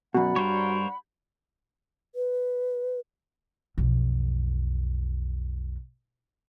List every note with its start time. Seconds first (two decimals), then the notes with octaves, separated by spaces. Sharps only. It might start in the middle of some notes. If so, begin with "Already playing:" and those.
0.15 F#2 B2 F#4 D5 F#5 B5
0.36 G2 A#4 C5 C#5
2.15 B4
3.78 B1 F2